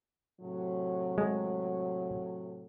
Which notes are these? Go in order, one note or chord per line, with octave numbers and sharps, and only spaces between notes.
A2 C3 F#3
G#3